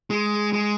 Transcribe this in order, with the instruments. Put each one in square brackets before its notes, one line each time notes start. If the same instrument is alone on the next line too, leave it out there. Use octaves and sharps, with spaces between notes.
[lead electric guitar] G#3
G#3